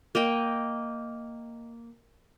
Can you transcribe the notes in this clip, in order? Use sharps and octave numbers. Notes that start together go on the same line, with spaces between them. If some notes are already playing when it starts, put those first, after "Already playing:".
A#3 D#5 G5